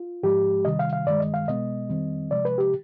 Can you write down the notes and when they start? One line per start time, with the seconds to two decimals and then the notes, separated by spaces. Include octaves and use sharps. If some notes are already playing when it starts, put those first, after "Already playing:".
Already playing: F4
0.23 G#2 F3 G#3 G4
0.65 C3 D#3 G3 D#5
0.79 F5
0.93 F5
1.06 G2 D#3 G#3 D5
1.20 D#5
1.34 F5
1.47 B2 G#3 B3 D#5
1.89 F2 D#3 G3 C4
2.30 C3 F3 G#3 D5
2.45 B4
2.58 G4